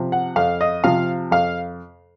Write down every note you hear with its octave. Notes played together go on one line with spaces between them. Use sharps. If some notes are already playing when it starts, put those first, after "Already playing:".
Already playing: C3 F3
F#5
F2 F5
D#5
C3 F3 F5
F2 F5